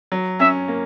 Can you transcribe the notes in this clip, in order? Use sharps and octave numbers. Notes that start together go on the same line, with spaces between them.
F#3
C#4 E5
A#3